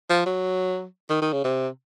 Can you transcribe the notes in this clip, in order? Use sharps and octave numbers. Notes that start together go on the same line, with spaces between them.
F3
F#3
D#3
D#3
C#3
C3